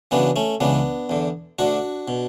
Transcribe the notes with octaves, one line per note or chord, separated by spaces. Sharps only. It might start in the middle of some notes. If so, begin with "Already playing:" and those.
F#2 C#3 E3 B3 D4
A3 C#4
C#2 C#3 E3 B3 D4
E2 D3
D2 D3 D4 F#4
B2